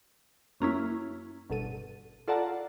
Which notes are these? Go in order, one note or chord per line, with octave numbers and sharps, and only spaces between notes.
F#2 A#3 C#4 E4
G1 B2 A4 D#7
F4 A4 D5 F#5 A5 A#5